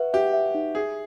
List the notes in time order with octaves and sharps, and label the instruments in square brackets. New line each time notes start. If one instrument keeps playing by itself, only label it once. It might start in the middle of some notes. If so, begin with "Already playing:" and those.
Already playing: [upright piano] F#4 [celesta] B4 E5
[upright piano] G4 [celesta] E5
[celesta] E5
D#4
[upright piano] G#4 [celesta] E5